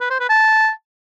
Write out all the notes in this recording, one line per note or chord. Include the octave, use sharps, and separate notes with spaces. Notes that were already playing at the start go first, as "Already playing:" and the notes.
B4
C5
B4
A5